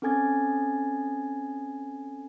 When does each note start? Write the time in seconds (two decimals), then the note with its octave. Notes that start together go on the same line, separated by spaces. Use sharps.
0.02 C4 C#4 A4 G#5 G#6 A6